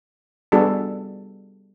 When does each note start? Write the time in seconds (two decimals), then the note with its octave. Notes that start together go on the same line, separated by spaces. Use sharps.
0.52 G3 B3 D4 F#4 G#4 A4